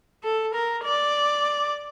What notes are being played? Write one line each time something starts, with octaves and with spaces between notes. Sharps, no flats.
A4
A#4
D5